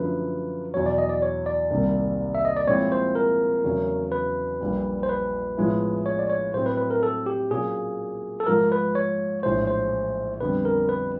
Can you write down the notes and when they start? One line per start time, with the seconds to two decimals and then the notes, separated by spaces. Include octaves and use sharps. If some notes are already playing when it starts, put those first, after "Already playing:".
Already playing: F#2 D3 F3 A3 B4
0.74 E2 B2 F#3 C#5
0.86 D5
0.98 D#5
1.09 D5
1.22 C#5
1.46 D5
1.70 C2 C3 D#3 G3 A#3
2.35 E5
2.45 D#5
2.57 D5
2.67 A#2 F3 G#3 C4 E4 C#5
2.92 C5
3.15 A#4
3.63 E2 C#3 F#3 A3 C#4
4.12 B4
4.60 A#1 A#2 G3 A#3
5.03 C5
5.09 B4
5.57 A2 F3 G#3 B3 E4
6.06 C#5
6.19 D5
6.30 C#5
6.54 A2 F#3 A3 C4 C5
6.66 B4
6.77 B4
6.91 A#4
7.03 A4
7.26 G4
7.50 A#2 F#3 A#3 C#4 G#4
8.40 A4
8.47 G#2 F3 A3 A#4
8.72 B4
8.95 C#5
9.43 A#1 A2 E3 G#3 C5
9.67 C5
10.41 F2 D3 G3 B3 B4
10.65 A#4
10.89 B4